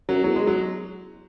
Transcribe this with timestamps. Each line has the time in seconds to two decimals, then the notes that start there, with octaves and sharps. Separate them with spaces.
0.09 F#2 F#3
0.24 E2 F#3
0.36 G#3
0.47 F#3